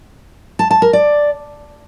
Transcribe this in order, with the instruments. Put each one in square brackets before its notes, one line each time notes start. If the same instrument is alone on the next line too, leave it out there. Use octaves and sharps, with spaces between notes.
[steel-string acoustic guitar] A5
A5
A#4
D5